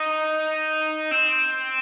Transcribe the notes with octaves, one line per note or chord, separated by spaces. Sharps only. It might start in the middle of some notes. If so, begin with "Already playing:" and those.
Already playing: D#4
C4